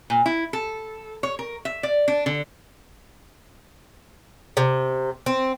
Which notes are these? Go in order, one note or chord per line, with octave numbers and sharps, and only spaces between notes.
A#2
E4
A4
C#5
A#4
E5
D5
D4
D3
C3
C4